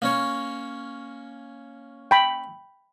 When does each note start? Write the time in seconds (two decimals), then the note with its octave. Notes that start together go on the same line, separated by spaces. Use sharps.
0.02 A#3 C#4 C#5
2.11 G5 B5